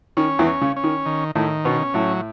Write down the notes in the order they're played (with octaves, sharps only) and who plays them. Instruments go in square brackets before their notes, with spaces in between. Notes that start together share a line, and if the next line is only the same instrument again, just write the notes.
[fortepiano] D#3 [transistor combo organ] C#4
[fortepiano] E2 E3
[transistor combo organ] C#4
[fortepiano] C#3
[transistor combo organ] C#4
[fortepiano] D#3
[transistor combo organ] D#3
[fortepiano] A2 A3 [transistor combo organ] D#3
[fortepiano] B2 B3 [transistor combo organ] C#4
[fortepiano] A2 A3 [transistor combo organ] F#3